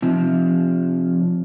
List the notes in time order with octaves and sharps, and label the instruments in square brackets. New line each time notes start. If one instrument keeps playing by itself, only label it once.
[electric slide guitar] C3 F3